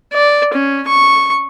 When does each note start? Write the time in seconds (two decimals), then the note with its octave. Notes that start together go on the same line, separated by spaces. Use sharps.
0.13 D5
0.54 C#4
0.88 C#6